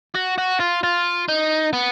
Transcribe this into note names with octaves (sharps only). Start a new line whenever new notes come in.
F#4
F#4
F4
F4
D#4
B3